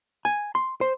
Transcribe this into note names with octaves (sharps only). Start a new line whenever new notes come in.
G#5
C6
C5